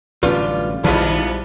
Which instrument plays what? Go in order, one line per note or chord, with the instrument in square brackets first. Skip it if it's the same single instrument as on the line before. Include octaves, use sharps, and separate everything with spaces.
[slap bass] A1 C#4 [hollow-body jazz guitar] F#2 D3 G3 [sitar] F4 [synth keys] B4
[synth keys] A#1 A5 [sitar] G#2 B3 F4 [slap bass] D#3 [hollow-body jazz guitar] G3 E4